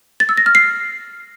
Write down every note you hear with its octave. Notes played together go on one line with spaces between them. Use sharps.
A6
E6
A#6
F6
C7